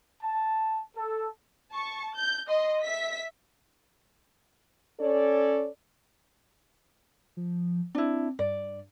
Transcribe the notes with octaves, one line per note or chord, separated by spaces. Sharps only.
A5
A4
A5 C#6
G6
D#5 C6
E5 B6
C#4 A4 C#5 D5
F3
C4 D4 E4
G2 D5